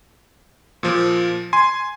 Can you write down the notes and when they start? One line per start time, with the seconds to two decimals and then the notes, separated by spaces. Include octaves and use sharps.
0.83 A#2 F3
1.53 G#5 C6